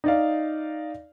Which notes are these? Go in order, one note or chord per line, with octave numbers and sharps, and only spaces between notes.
D#4 D5 F5